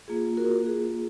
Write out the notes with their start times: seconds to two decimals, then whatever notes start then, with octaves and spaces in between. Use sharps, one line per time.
0.08 A#3 F4 G#4
0.37 F#4 A#4
0.66 G#4